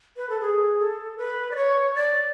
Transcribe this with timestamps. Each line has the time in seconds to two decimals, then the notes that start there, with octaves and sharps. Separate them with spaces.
0.17 B4
0.29 A4
0.41 G#4
0.79 A4
1.18 B4
1.51 D5
1.56 C#5
1.95 D5